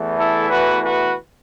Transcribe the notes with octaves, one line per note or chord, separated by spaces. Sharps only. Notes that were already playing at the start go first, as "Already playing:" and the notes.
Already playing: E2 E3 A3
E4 A4
F#4 B4
F#4 B4